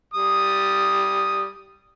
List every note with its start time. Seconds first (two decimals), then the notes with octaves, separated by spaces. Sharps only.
0.14 G3 D#6